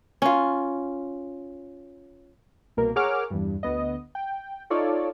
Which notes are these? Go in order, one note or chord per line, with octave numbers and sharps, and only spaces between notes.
C#4 F4
C2 B2 A#3 A#4
G#4 A#4 C#5 F#5 D6 F6
E2 G2
D2 B3 D#5
G5
D#4 F4 A4 C#5 D5